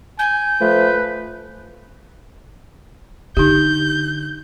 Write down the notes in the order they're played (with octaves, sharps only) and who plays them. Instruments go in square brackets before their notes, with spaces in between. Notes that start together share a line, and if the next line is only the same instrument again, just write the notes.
[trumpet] G#5 [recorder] G6
[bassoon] F3 [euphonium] A3 [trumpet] B4
[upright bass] D3 [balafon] D#4 G4 [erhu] G6